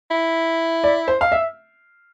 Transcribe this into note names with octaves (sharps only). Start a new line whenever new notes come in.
E4
D5
C5
F5
E5